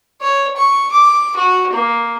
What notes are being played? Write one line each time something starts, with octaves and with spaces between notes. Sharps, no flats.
C#5
C#6
D6
F#4
A#3